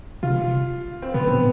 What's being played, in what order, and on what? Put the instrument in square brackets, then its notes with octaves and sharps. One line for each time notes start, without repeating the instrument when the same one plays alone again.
[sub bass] C3 [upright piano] F4
[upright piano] C4
[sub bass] B2 [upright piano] B3
[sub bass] A2 [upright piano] C4